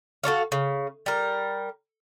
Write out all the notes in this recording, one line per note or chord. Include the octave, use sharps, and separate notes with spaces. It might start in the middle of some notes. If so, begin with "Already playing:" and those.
F#4 A4 C#5 F5
C#3
G3 A#4